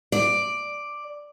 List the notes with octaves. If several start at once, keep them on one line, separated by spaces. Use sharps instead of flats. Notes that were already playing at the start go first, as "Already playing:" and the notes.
D5